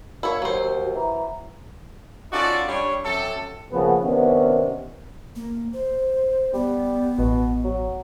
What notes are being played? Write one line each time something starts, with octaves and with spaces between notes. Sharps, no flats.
A#3 E4 F#4 C#5
D#2 F#3 C5
E3 A#5
C#4 D#4 F4 F#4 A4 D5
G3 D4 C#5
C3 F#3 C#4 A4
C#3 F3 A#3 B3
C3 D#3 B3 C#4 D4
A#3
C5
G3 B3
A1 B2
F#3